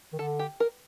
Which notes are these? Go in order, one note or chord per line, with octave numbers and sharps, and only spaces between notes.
D#3
D3 A4
G4
A#4